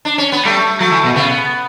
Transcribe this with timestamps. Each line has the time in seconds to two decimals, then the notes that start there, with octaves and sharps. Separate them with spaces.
0.05 D4
0.18 C#4
0.32 B3
0.45 G3 A3
0.80 F#3 A3
0.92 E3
1.04 B2
1.16 C#3 B3